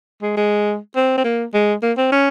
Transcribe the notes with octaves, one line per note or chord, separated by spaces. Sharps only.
G#3
G#3
C4
C4
A#3
G#3
A#3
C4
C#4